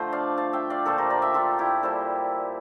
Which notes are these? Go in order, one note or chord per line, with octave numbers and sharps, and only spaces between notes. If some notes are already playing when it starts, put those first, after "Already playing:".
Already playing: D3 F3 A3 C5
D5 F5
F5 A5
E5 G5
D5 F5
A#2 F3 A3 A4 C5
G4 A#4
A#4 D5
E5 G5
F4 A4
E4 G4
A#2 G3 A4 C5